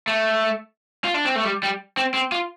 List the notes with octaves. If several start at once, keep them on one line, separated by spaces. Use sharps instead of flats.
A3
F4
D4
C4
A3
G3
G3
C4
C4
F4